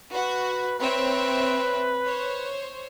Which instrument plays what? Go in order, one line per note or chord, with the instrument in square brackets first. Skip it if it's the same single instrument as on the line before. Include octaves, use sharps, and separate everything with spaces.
[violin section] F#4 [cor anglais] B4
[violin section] C4 C#5 E5 [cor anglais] B4
[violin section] C5 C#5